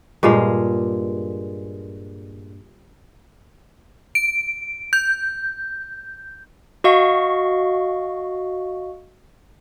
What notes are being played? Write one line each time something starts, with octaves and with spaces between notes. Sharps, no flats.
G2 A#2 G#3 F5
D7
G6
F#4 D#5 F5 C#6